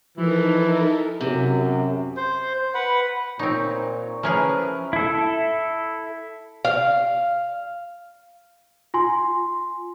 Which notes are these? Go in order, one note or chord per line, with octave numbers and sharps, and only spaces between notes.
E3 F3 D#4 E4 A4 A#4
F#2 C3
C5
B4 F#5
A#2 C4 D#4 C#5
F3 C#4 E4 G#4 A#4 B4
E4 A4
F5
F4 G#5 C6